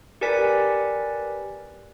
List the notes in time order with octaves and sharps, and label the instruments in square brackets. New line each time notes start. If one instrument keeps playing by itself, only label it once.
[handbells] G4 A#4 B4 D5 G#5 B6